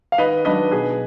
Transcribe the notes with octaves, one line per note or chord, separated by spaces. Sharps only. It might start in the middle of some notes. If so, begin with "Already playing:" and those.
F5
D#3 B4 D#5
F#3 D4 B4 D#5
B2 G#4 B4